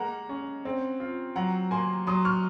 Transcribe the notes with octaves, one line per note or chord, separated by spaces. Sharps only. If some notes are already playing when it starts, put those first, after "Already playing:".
Already playing: G#3 A#3 F#5 A#5
C#4
C4
F4
F#3 F#5 A#5
A#3 G#5 C6
F#3 C6 D#6
C#6 F6